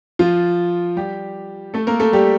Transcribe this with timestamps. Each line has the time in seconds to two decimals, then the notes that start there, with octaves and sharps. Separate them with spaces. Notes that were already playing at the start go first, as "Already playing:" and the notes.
0.19 F3 F4
0.96 G3 G4
1.74 A3 A4
1.87 A#3 A#4
2.00 A3 A4
2.13 G3 G4